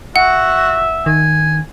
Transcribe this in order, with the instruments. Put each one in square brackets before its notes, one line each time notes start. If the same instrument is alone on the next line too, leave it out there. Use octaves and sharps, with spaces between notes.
[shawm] F#4 [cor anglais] E5 [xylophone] F#5
[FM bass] D#3 [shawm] G#5